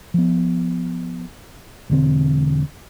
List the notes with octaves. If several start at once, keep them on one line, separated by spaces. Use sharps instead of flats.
F3 B3
E1 D3 C4